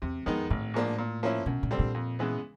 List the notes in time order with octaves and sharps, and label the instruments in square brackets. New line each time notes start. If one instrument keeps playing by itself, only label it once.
[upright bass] E2 [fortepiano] C3
[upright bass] F2 [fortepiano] D#3 G#3 B3 D#4
[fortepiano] G#1 [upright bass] A2
[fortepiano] G#2 F3 A#3 D4
A#2
F3 A#3 C#4 E4
[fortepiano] F#2 [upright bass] B2
[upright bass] A#2
[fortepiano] D3 G3 C4
[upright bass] A#2
[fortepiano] F2
C#3 E3 G#3 B3